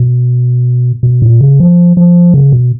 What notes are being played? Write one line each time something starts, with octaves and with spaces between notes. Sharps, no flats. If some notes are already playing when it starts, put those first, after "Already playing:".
Already playing: B2
B2
A#2
C#3
F3
F3
C#3
B2